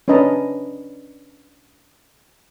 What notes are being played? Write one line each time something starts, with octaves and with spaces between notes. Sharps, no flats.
C#4 D4 B4 D#5 A5 A#5